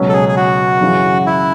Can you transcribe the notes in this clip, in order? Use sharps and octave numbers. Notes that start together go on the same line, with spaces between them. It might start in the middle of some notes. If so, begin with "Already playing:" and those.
Already playing: C#2 B2 F#3 C#4
A4
G#4
G#4
F#4
F#2 C#3 E3
E4